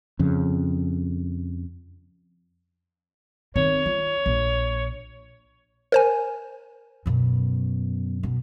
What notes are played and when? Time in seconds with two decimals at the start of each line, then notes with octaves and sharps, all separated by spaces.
0.19 F2 C#3
3.56 D#3 C4 C#5
3.86 F4
4.26 A#1
5.92 A#4 C5 G#5
7.06 F#2 B2
8.23 B2